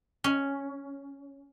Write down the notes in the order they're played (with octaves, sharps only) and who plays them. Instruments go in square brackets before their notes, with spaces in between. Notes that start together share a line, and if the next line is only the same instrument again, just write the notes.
[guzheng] C#4